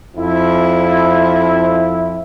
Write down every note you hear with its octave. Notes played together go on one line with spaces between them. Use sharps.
F2 E4